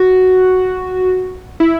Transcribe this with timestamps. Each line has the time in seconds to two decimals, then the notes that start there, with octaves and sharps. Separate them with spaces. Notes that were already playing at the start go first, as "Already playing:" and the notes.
Already playing: F#4
1.60 E4